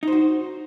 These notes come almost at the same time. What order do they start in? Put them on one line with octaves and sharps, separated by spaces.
D#4 C5 F#4